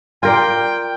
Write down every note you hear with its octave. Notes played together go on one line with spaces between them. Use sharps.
F4 A#4 D5 G5